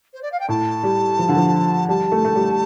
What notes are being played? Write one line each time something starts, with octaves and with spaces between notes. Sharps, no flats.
C5
D5
F5
G5
A2 A5
G3
F3
D3
F3
G3 A5
A3
A3
G3